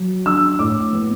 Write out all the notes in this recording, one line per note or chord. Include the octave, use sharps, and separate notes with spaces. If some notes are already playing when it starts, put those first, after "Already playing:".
Already playing: F#3
D4 E6
A2 D6
B3